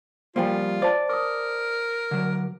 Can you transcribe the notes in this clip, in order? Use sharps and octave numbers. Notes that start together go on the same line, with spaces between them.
F3 G3 A#3 F4 C5 G5 G#5
C5 D5 A5
A#4 D6 D#6
D3 F#3